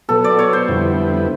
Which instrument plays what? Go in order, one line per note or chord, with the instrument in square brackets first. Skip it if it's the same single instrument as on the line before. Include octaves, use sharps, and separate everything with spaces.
[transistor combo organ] B2 F#3 B3 [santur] A4
[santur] D5
C#5
C5
[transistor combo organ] F2 D3 G3 B3 E4